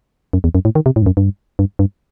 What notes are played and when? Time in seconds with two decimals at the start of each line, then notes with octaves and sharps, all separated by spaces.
0.33 F#2
0.44 E2
0.55 F#2
0.65 A2
0.75 D#3
0.86 C3
0.96 A2
1.02 G2
1.06 F#2
1.17 G2
1.59 G2
1.79 G2